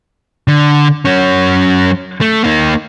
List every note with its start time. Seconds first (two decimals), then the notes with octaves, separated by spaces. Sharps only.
0.48 D3
1.05 F#3 C#4
2.21 A3
2.44 A#3 D#4